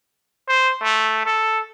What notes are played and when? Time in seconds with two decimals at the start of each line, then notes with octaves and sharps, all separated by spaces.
0.48 C5
0.82 A3
1.26 A4